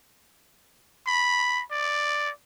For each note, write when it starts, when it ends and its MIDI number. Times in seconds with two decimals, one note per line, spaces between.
1.07 1.63 83
1.71 2.31 74